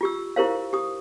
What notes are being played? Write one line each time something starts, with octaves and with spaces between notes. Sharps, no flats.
F4 G4 E6
E4 G4 A#4 C5 F5
G4 D#6